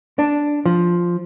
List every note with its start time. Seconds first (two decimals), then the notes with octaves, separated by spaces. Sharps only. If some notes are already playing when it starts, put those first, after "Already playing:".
0.19 D4
0.65 F3